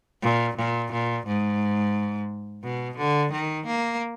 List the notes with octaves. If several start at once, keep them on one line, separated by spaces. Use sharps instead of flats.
A#2
A#2
A#2
G#2
B2
D3
D#3
A#3